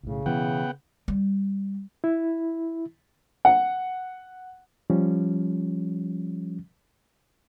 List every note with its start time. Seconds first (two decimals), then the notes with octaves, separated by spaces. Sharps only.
0.03 B1 A2 C#3
0.26 B2 E3 B3 F#5 G5
1.08 G3
2.04 E4
3.45 F#5
4.90 F3 G3 C#4